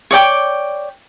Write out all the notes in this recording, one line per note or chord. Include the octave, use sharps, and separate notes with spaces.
C#5 D5 G5 D6